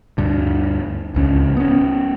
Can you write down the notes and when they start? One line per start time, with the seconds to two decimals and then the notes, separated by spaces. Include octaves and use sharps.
0.18 D2 G2 D3
1.15 D1 C#2 C#4
1.57 B3 C#4